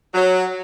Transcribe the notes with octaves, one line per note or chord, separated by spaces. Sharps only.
F#3